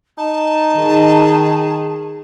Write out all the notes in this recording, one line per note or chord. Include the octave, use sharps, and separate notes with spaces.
D#4 A5
D#3 G#4